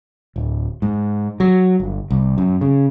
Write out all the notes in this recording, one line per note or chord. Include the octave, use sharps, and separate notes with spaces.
D1
G#2
F#3
G1
C2
F#2
C#3